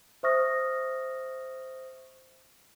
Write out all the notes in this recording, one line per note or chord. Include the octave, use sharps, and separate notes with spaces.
C5 E5 C#6 D#6 F6 A#6